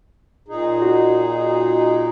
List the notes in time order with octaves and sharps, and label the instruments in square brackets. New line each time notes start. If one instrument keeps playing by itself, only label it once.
[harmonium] A#2 D#4 G#4
[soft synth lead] F#4